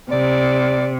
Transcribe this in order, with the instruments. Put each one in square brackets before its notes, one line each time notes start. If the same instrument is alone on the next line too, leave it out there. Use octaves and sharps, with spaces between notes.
[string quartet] C3 [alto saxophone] D5